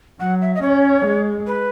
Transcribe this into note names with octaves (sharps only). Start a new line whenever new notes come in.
F#3 F#5
E5
D#5
C#4 C#5
G#3
B4